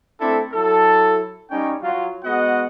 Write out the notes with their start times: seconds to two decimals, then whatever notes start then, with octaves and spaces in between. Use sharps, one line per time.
0.20 A3 C4 D4 E4 A4
0.53 F#3 E4 A4
1.51 G3 C#4 D#4 C#5 G5
1.82 F#3 F4
2.24 G#3 B3 F#4 D#5 F#5